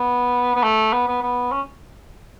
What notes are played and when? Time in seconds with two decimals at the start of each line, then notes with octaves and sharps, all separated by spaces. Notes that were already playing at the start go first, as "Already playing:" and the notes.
Already playing: B3
0.55 B3
0.63 A3
0.93 B3
1.08 B3
1.22 B3
1.52 C#4